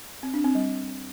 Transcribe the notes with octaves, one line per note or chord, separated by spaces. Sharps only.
C4
D4
C4
G3